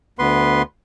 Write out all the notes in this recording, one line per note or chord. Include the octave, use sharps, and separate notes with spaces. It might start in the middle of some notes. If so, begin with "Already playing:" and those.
D2 B3 B4 C6